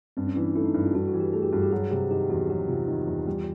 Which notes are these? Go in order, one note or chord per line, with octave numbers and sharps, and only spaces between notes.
G2 C4
C#4
E3 D4
D#4
A3 E4
D#4
G2 E4
F4
G2 F#4
F#4
E3
G4
A3 G#4
G4
G2 F#4
G4
F#3 G#4
C3 G4
D#3 G4
E2 F#4
F#3 G4
C3 F4
D#3
E2
G3